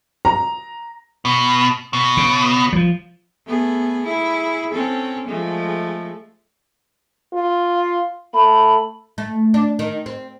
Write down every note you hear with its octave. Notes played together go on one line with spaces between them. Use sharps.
A#5
B2
B2
C#3
F3 F#3
A3 B3 G#4
E4 G#4
C4 C#4 A4
F3 G#3 A3
F4
A3 B5
A3
D4
D#3
C4